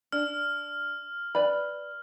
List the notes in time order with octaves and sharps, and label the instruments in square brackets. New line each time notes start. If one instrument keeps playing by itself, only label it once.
[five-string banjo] D4 [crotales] F6
[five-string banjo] B4 D5 B5